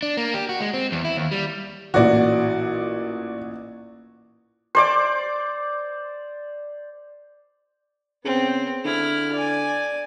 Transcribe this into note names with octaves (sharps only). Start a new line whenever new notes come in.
D4
A#3
G4
F#4
G#3
C4
E2
E4
D#2
G3
A1 A#2 F#4 D5
C5 D5 D6
C#3 B3 C4
D3 E4 F6
D5 G#5